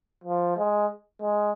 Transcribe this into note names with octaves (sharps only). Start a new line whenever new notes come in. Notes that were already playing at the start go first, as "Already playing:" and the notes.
F3
G#3
G#3